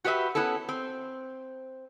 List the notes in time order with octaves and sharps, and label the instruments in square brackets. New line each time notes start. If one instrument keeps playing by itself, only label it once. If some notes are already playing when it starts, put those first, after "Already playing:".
[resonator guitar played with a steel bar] F#4 G4 B4 D#5 E5
B3 C#4 E4 A4
C4